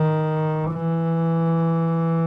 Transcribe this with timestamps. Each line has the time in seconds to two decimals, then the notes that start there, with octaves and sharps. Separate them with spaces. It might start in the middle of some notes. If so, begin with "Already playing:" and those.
Already playing: D#3
0.72 E3